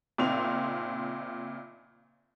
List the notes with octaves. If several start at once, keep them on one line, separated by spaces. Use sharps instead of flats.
F#1 A#2 C4 D#4 C6 F7